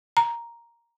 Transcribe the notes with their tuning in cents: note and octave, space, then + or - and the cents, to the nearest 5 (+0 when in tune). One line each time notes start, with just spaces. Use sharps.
A#5 +5